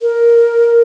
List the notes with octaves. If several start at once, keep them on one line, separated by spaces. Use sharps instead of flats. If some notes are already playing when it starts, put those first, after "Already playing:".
A#4